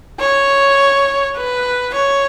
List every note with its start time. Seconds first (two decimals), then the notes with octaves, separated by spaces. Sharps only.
0.20 C#5
1.37 B4
1.95 C#5